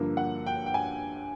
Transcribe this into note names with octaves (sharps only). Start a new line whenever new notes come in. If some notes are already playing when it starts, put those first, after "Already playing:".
Already playing: G2 D3 F3 A#3
F#5
G5
G5
G#5